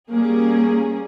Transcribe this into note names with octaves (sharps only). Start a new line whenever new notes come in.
G3 A#3 C#4 G#4